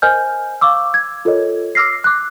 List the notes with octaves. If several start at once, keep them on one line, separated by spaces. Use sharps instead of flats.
A#4 C5 D#5 G#5 F6 G6
F5 C#6 D6 E6
G#6
F4 A4 A#4 C#5 D#5
D6 E6 F6 A#6 C7
D6 F#6